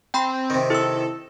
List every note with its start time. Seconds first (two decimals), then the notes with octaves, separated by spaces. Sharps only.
0.14 C4 G5 B5 C6
0.50 C3 D#3
0.70 E4 A4 E6